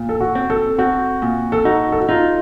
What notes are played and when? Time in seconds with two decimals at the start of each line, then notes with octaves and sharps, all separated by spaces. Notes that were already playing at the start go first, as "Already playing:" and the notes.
Already playing: A#2
0.09 A4
0.20 F#4
0.35 C4
0.50 A4
0.78 C4 F#4
1.22 A#2
1.52 A4
1.65 D#4 F#4
1.92 A4
2.00 F#4
2.09 D#4 F4